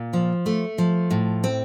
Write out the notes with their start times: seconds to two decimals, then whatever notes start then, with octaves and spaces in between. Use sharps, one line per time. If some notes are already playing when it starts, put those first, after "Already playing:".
Already playing: A#2
0.13 F3
0.46 A3
0.78 F3
1.11 A2
1.44 C4